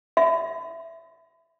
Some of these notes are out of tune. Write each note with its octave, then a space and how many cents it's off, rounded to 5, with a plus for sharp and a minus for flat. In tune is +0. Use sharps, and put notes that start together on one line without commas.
E5 +5 B5 +35